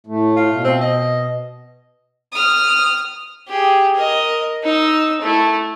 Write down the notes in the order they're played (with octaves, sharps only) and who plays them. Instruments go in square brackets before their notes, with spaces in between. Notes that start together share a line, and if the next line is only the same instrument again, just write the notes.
[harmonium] A2 A3
[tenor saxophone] F4
[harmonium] B2
[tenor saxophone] C4
D#5
[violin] D#6 F6
[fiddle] G4 G#4
A#4 D#5
D#4 E6
A3 E4